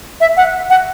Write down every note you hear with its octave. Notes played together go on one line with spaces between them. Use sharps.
E5
F#5
F#5